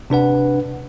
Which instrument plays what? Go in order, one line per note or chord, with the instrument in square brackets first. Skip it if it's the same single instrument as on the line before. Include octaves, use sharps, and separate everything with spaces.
[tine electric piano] C3 D4 B4 F#5